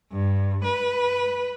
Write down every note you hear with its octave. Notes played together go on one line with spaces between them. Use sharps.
G2
B4